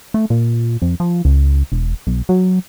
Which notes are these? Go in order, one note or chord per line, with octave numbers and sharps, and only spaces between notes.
A3
A#2
F2
F3
C#2
E1
B1
F#3